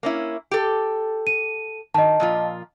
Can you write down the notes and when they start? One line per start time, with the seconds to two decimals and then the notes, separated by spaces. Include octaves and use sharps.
0.03 A#3 C#4 E4
0.51 G4 A4
1.27 D#7
1.94 D#3 D#5 A5
2.20 A#2 F3 F4